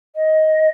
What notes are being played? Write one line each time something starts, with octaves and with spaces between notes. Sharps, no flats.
D#5